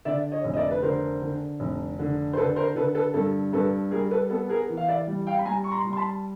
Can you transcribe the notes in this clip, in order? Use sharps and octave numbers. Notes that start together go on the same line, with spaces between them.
D3 D5 E5
C#5 D#5
F1
D#5
D5 E5
B4
D3 A#4 C5
D3
F1
D3
C5
D3 A4 B4
A#4 C5
D3 A4 B4
A4 B4
G2 A4
G2 A4 B4
G3 G#4 A#4
A4 B4
B3 A4
G#4 A#4
E3
F5
D5 E5
G3
F5 G5
B5
G3 G#5 A#5
C#6
A#5 C6
G3
C6
A5 B5